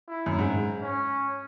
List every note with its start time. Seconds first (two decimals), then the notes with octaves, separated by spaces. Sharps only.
0.08 E4
0.26 F#2
0.39 G#2
0.82 C#4